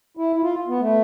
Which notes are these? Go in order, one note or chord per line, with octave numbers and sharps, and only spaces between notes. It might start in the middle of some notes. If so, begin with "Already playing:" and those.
E4
E4
F4
B3
A3